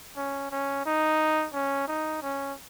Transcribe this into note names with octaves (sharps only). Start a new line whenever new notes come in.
C#4
C#4
D#4
C#4
D#4
C#4